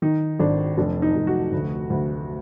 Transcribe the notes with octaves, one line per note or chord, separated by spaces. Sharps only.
D#3 D#4
G#1 D4
F1 D4
D#4
F1
F#4
D2
D2